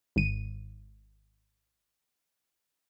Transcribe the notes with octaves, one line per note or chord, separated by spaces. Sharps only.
G#1 D#7